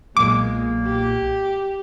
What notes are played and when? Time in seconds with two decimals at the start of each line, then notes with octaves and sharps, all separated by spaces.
0.17 B1 A#2 G#3 A#3 D6
0.85 G4